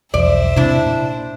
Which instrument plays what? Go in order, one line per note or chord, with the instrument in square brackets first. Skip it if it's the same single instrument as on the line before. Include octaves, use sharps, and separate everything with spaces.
[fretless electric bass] B1 E2 F3 [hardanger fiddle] C5 E5 [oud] D5
[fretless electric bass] C3 [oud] D4 E4
[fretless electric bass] A#2